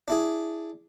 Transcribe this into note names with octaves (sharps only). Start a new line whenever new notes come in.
D4 E4 G#4